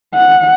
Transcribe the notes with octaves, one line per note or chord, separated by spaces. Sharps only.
F#5